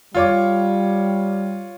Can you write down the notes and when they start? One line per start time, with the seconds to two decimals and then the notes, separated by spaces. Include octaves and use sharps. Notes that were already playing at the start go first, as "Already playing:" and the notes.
0.15 G3 F4 C#5 D6